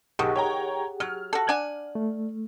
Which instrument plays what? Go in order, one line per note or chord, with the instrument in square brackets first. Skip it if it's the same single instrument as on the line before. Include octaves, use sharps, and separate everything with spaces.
[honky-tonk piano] B1 C#6 [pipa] D#3 [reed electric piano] G4 G#4 F#5
[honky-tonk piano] C#5 G5 A#5
[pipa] F#3 [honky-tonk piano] F6
[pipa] F#4 A4
D4 F#5 G#5
[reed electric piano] A3